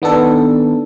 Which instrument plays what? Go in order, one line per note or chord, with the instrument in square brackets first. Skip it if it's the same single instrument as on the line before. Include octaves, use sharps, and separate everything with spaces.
[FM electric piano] D#3 B3 D4 A4